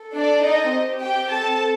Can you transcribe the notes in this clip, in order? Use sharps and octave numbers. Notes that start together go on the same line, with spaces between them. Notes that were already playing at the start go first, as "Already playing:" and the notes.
Already playing: A4
D4 D5
D#4 D#5
C4 G4
G4 G5
A4 A5